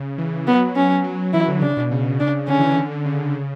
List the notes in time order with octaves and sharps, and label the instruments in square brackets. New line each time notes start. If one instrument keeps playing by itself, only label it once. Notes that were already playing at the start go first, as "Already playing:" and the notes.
Already playing: [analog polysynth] C#3
E3
[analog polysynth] F#3 [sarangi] B3
[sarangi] C#4
[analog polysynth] F#3
[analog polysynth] E3 [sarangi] E4
[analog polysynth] D3
[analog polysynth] C#3 [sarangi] D4
[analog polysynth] B2
C#3
[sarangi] D4
[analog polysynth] D3 [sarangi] C#4
[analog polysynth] E3
C#3
D3
D3
C#3
C#3